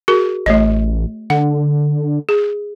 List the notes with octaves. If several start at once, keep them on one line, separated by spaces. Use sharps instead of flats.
F#4 G#4 A#4
A1 A3 C#5 D#5
D3 F#5
G#4